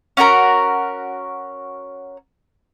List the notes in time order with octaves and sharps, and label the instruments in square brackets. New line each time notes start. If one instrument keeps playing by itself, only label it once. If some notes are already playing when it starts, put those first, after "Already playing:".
[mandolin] C#4 F#4 A#4 A#5